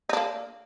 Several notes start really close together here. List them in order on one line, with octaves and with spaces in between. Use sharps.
D#4 D4 A#3